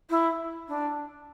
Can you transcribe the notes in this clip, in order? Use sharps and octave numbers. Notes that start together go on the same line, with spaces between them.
E4
D4